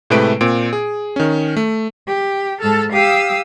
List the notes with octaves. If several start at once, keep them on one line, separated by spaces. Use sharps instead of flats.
A2 C3 G#3 A3 B4 D7
A#2 C4 D7
G#4
D#3 C#4
A3
G4
G#2 A4 A5 F6
G4 F5 D#6 E6